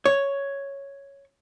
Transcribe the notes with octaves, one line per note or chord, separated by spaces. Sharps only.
C#5